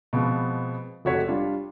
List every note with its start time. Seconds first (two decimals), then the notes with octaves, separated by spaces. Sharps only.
0.13 B2 F3 G#3 B3 C4
1.05 F1 C3 F#4 A4 C#5 B6
1.28 G3 D4 F4